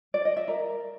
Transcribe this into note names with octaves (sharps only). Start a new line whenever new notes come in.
D5
D#5
E5
A#4